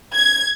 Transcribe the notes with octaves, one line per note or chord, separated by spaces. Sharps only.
G#6